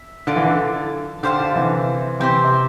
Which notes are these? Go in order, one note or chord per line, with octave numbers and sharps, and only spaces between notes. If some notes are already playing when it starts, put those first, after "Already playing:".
Already playing: E5
D3 F4 A4 D5
E3
D3
D3 G4 C5 F5 A5
D3
C3 E3
C3 E3 C4 G4 C5
C3